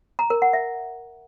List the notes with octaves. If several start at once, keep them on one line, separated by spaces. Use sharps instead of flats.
A#5
A#4
F#5
E5